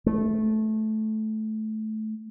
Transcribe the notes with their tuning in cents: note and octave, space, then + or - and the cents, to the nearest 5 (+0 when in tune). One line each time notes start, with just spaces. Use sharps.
A3 -15